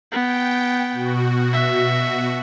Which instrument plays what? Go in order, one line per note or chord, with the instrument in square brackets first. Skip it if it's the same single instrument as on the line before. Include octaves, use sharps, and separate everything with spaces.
[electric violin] B3 [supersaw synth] G5
[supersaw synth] B2 F#4
[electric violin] E5